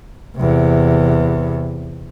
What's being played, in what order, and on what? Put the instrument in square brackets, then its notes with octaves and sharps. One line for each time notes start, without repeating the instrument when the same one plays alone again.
[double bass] E2 C3